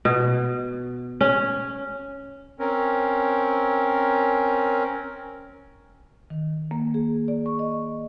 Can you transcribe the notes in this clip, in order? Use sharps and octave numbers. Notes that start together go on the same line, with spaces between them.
B2
C#4
C4 C#4 A#4
D#3
A#3
G#4
D5
C#6
D#5